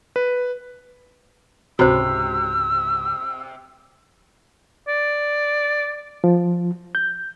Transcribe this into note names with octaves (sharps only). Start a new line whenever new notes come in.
B4
C#2 G#2 C3 F#4 C5 E6
D5
F3
G6